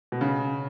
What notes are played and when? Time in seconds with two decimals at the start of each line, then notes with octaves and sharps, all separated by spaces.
0.12 B2
0.21 C#3